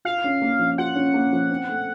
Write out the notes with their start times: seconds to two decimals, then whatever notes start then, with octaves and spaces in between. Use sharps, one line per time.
0.05 F4 F5
0.24 C#4
0.42 A#3
0.59 F3
0.78 F4 F#5
0.95 C#4
1.14 A#3
1.33 F3
1.50 C4
1.69 A3